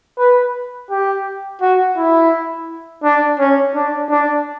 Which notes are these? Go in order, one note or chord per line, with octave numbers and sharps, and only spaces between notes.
B4
G4
F#4
E4
D4
C#4
D4
D4